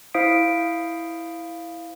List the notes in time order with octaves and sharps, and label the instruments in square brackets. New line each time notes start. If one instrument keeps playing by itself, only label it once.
[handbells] E4 C5 F5 D#6 B6 D7